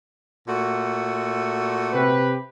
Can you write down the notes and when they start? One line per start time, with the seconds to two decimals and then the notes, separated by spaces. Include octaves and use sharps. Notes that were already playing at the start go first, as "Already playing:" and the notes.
0.48 A#2 A3 F#4
1.93 C3 G4 B4